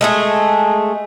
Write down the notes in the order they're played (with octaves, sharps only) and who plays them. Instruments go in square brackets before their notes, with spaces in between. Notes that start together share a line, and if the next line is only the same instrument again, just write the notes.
[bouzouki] G#3 A3 G#4